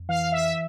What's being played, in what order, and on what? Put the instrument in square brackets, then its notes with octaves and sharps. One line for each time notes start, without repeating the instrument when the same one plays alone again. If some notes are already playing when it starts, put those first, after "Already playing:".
Already playing: [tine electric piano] F2
[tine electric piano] E3 [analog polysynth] F5
[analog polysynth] E5